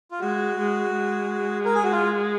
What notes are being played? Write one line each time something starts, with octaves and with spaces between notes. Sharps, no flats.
F4
G#3 F#4
G#3
G#3
A#4
G#4
F#4
F4